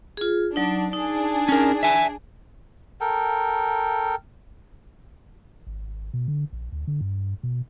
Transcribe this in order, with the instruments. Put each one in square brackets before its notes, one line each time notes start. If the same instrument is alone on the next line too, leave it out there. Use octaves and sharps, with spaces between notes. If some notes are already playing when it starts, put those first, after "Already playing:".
[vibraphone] F4 G#4
[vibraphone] F#3 D#4 [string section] D4
[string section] D4 G#4 [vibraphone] D#4
[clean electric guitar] C#4 A#4
E5 G#5
[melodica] A4 A#4 G5
[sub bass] G#1
B2
D3
A#1
D2
D3
G2
B2